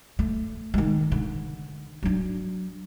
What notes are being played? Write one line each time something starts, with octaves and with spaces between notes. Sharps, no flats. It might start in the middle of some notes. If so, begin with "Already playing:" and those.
A3
D#3 G#3
D3
F#3 D4